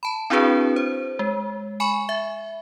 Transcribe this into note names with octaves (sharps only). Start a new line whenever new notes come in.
A5 B5
C4 D4 E4 F#4 G#4 B4
C5
G#3
G#5 B5 C#6
E5